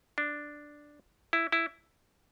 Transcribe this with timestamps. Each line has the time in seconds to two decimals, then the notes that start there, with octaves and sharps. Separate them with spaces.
0.18 D4
1.33 E4
1.52 E4